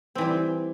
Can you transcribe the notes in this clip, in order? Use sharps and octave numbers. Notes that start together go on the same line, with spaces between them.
E3 G3 C4